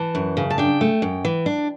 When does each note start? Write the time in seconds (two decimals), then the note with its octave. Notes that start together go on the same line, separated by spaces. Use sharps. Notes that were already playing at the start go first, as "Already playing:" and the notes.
Already playing: E3 A5
0.15 F#2
0.37 C#3
0.50 A5
0.58 D4 G5
0.81 A3
1.02 F#2
1.25 E3
1.46 D4